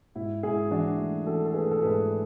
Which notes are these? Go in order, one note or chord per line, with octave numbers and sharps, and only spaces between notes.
G#2 E4
G#2 E4 G#4
E3 D4 F#4
A3
E3 F#4 A4
A4
A3 G#4 B4
A4
G#2 G#4 B4